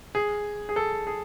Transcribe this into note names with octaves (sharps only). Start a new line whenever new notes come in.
G#4
G#4
A4
G#4